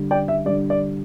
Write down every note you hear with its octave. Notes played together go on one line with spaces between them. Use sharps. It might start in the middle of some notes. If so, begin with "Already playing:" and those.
Already playing: D3 G3
D5 G5
E5
D3 G3 D5
D5